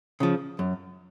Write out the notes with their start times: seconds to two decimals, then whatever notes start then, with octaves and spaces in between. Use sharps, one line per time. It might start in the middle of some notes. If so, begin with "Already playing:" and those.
0.20 C#3 F3
0.59 F#2